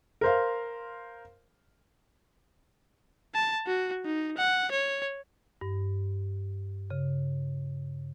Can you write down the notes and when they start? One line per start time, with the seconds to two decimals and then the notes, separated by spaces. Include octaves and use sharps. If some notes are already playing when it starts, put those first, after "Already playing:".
0.21 A#4 C5 F5
3.35 A5
3.67 F#4
4.05 D#4
4.37 F#5
4.71 C#5
5.61 G2
6.90 C#3